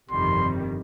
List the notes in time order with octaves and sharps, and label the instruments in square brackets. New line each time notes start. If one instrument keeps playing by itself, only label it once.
[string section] G1 F2 C3 D#3 G3 [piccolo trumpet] C6